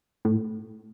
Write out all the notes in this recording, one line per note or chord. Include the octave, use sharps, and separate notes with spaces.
A2